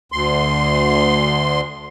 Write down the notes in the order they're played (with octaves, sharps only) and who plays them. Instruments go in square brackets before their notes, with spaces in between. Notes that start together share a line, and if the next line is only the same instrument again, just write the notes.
[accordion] D2 C6